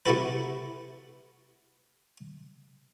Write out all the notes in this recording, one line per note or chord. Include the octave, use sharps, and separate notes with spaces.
C3 A3 E4 F#4 A4 B4